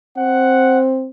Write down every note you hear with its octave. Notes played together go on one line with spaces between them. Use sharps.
C4 F#5